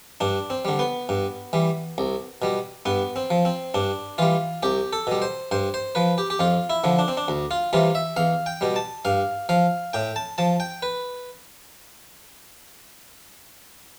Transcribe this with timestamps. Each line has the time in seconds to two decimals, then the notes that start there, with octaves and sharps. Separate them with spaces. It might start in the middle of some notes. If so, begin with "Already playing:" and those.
0.21 G2 D4
0.50 C4
0.65 D3 G3
0.79 B3
1.09 G2
1.53 E3 G3
1.98 C2
2.42 B2 G3
2.86 G2 B3
3.16 C4
3.30 F3
3.45 C4
3.74 G2 D4
4.18 E3 G3 F4
4.63 C2 G4
4.93 A4
5.07 B2 G3
5.22 C5
5.51 G2 C5
5.74 C5
5.95 F3 B4
6.18 G4
6.30 G4
6.40 F2 F4
6.70 E4
6.84 D3 F3
6.99 D4
7.08 C4
7.17 D4
7.28 D2
7.51 F4
7.73 C3 E3 G3 F4
7.95 E5
8.16 E2 F5
8.46 G5
8.61 B2 G3
8.76 A5
9.05 G2 F5
9.49 F3 F5
9.93 A2 G5
10.16 A5
10.38 F3 A5
10.60 G5
10.83 B4